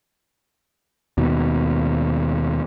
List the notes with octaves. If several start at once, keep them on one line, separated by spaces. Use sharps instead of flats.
D#2 B2